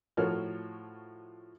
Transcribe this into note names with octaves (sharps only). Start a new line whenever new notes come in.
A2 F3 F#4 A#4 C#5 F6